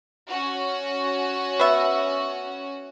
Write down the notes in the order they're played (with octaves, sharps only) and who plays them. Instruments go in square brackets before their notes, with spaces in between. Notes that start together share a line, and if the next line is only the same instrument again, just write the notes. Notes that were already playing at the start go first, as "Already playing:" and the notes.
[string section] C#4 F#4
[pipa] B3 E5